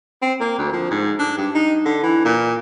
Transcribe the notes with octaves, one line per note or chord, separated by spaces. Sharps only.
C4
A#3
D2
F3
G#2
D4
G2
D#4
D3
E3
A#2